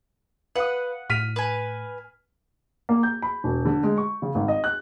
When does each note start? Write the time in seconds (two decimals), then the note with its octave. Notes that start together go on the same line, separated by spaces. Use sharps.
0.56 B4 F5 F#5 D#6 C#7
1.10 A2 F6 B6 D#7
1.36 B4 G#5
2.89 A#3
3.03 G6
3.22 B5
3.44 E1
3.65 D3
3.83 G#3
3.98 C#6
4.22 C#3
4.35 G#1
4.48 D#5
4.64 F#6